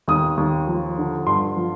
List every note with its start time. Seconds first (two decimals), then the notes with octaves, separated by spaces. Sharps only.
0.08 D#2 D#6
0.37 D#2
0.67 F3
0.98 D3
1.26 G2 C6
1.56 F3